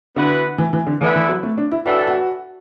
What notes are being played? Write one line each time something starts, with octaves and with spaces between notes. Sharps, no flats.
D3 E3 B3 F#4 B4
E3
E3
D3
D3 E3 B3 E4 B4
E3
F#3
A3
D4
E4
A2 E3 D4 F#4 A4
F#4